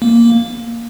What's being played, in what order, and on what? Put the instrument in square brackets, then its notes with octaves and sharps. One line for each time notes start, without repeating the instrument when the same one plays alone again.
[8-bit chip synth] A#3